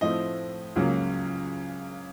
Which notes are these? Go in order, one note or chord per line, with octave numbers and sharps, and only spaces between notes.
A2 F3 A3 C4 D#5
C#2 C#3 F#3 A#3